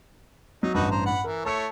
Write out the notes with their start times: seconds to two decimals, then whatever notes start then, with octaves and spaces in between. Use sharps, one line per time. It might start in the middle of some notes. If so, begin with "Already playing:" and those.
0.63 F#3 D#4
0.74 A1 G2 D#4 F#4 B4
0.91 C5 A#5
1.06 F#5 B5
1.24 E3 A#4
1.45 A3 E4 C#5 A5 E6 C#7